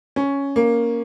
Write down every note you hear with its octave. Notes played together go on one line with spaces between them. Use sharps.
C#4
A#3